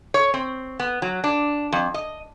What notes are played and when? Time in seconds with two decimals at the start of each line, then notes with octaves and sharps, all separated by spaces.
0.14 C#5
0.34 C4
0.80 B3
1.02 F#3
1.24 D4
1.72 F2
1.94 D#5